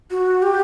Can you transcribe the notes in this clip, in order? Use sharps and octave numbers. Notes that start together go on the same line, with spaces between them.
F#4
G4